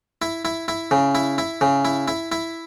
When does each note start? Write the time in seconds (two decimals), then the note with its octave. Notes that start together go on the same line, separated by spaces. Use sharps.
0.22 E4
0.45 E4
0.68 E4
0.91 C#3
1.15 E4
1.38 E4
1.61 C#3
1.85 E4
2.08 E4
2.32 E4